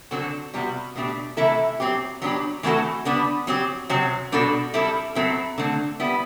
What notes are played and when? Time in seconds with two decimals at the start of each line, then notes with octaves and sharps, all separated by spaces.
0.11 D3 F#3 C4 F#4 A4
0.54 C3 G3 B3 F#4
0.96 B2 A3 D4 G4
1.37 C3 E3 A3 E4 A4
1.80 F#3 C4 G4
2.22 F#3 B3 D4 G4
2.63 E3 A3 C4 F#4 A4
3.05 D3 G3 B3 D4
3.47 F#3 C4 G4
3.89 C3 F#3 C4
4.32 B2 G3 D4 F#4 A4
4.74 G3 C4 E4 A4
5.15 F#3 C4 E4 A4
5.58 D3 A3 C4
6.00 G3 B3 E4